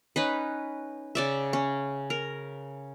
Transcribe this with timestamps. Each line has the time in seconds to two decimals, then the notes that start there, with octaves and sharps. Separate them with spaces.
0.16 C#4 D#4 B4
1.15 C#3 D5 E5
1.53 C#4
2.10 A#4